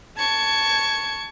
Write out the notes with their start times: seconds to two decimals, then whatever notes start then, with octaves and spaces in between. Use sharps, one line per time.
0.18 A5 C#6 G#6